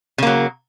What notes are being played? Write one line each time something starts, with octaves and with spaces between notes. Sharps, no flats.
C#3 F#3 A#3